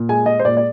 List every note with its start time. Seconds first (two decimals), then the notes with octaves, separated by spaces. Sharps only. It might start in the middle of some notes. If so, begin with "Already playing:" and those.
Already playing: A#2
0.09 G#3 G#5
0.26 G#3 D#5
0.40 C5
0.45 A#2 D5
0.57 D5